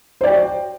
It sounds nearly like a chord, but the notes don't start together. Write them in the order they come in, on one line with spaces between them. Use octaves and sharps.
C5 D5 G5 F#4